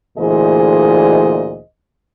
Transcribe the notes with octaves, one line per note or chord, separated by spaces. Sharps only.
D2 A#2 E3 G#4 C5 D#5